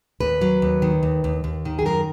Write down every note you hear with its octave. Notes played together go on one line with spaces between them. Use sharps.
D#2 B4
F#3
D#2
D#3
D#2
D#2
D#2
D#3
G#4
F#2 A#4